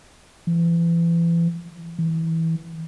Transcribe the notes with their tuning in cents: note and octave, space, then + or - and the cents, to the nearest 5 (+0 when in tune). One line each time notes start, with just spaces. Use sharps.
E3 +35
E3 -20